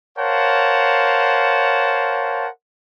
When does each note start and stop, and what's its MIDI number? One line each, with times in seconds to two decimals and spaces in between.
0.18 2.49 70
0.18 2.49 72
0.18 2.49 73
0.18 2.49 77
0.18 2.49 78
0.18 2.49 81